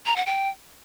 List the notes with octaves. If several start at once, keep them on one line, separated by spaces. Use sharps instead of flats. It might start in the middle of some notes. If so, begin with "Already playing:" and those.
A#5
F#5
G5